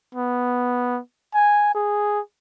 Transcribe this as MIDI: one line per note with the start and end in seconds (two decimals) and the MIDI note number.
0.15 1.00 59
1.35 1.72 80
1.75 2.20 68